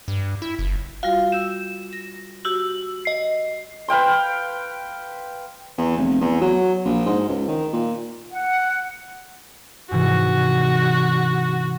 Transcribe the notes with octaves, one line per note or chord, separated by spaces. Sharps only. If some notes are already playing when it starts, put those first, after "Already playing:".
G2
E4
F#1
G3 F4 F#4 F5
E6 G6 E7
A#6
F#4 G4 E6 F#7
D#5 C7
B4 F5 G5 C6
E2
F1
E2
F#3
A#1
G#2
C#2
D#3
A#2
F#5
G#2 C3 E3 F#4